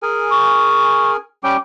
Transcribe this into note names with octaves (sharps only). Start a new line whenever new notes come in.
G#4 A#4 G#5
C#6
G3 C#4 G5 D6